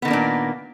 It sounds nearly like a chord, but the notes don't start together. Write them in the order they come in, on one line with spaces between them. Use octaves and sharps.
B3 D#3 A#3 D4 A#2